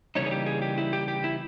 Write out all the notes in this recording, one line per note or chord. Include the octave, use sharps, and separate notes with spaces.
C#3 E3 G3 A#3 D#4 C#5
G#4
G4
G#4
G4
E4
G4
G4
E4